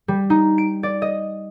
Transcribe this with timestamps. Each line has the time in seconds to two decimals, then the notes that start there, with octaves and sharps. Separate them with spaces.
0.08 G3
0.30 D#4
0.58 D7
0.83 D5
1.02 D#5